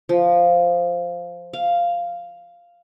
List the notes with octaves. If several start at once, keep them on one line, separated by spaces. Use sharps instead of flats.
F3
F5